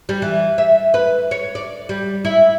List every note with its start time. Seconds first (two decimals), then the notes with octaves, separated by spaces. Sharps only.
0.09 G3
0.22 E3
0.58 E5
0.94 B4
1.31 C#5
1.55 D5
1.89 G3
2.25 E4